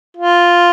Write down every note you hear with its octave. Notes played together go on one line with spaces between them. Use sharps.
F4